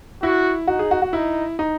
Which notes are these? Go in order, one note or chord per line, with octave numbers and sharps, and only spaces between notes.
E4 F#4
D#4 F#4
G#4
F#4
F#4
D#4 E4
D#4